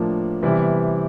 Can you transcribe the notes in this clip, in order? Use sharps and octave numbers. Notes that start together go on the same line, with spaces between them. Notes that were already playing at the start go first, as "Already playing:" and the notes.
Already playing: A2 F3 A#3 D4
C3 E3 G3 B3 E4